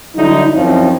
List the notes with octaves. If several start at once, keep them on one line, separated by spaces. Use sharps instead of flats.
D3 F#3 G3 D#4 E4
F#2 F3 C4 D#4 E4 C#5